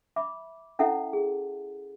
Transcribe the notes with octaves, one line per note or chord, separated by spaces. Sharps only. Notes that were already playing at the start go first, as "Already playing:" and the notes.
E5 B5 D6
C#4 E4 A4 E5 F#5 A5
G#4